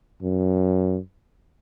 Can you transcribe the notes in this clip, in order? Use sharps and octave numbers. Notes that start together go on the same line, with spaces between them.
F#2